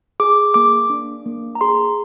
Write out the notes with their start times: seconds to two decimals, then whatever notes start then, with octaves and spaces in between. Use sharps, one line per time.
0.20 G#4 D6
0.54 A#3 D6
0.90 D4
1.26 A#3
1.55 A#5
1.61 G#4 C6